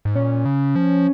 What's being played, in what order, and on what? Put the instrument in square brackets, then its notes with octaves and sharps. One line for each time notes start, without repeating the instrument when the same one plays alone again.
[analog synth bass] G#2
[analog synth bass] A#2 [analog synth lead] C#4
[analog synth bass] C#3
F3